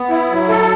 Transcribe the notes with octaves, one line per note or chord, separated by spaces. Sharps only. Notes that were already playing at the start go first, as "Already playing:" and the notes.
Already playing: B3
E4
F#3
A4